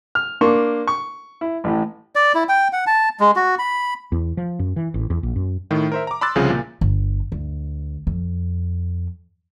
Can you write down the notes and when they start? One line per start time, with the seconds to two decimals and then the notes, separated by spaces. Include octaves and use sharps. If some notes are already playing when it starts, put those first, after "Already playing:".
0.15 F6
0.41 A#3 D4 A#4 C6 C#6
0.88 C#6
1.41 E4
1.64 A1 A2
2.16 D5
2.35 E4
2.49 G5
2.73 F#5
2.87 A5
3.20 G#3
3.36 F#4
3.59 B5
4.12 E2
4.37 F3
4.59 F#2
4.76 E3
4.94 A1
5.10 E2
5.23 A#1
5.36 F#2
5.71 A2 D#3
5.92 A#4 C5 E5
6.07 A#5 D6
6.21 B5 C6 D6 E6 F#6 A6
6.35 C2 C#3 F3 F4 G#4
6.50 A#2
6.81 G1
7.32 D2
8.07 F2